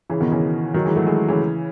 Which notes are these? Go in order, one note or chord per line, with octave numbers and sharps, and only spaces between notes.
C#3 E3
B2 D#3
C#3 E3
D#3 F#3
E3 G#3
F#3 A3
E3 G#3
C#3 E3